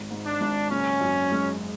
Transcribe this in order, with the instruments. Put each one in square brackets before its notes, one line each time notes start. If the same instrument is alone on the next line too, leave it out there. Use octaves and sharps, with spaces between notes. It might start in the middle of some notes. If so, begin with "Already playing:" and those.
Already playing: [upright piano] G#1
G#2
[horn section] D4
[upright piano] G#1
[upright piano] F#1 [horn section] C#4
[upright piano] F#2
G#3